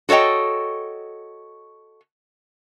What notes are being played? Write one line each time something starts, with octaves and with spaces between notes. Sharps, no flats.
F#4 A4 C#5 D#5 G5